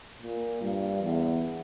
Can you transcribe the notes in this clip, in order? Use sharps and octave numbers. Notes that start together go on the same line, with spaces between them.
A#2
G2
E2